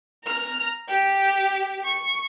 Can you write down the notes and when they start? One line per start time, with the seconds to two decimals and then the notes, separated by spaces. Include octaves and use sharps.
0.24 A#5 F6
0.88 G4
1.85 C#6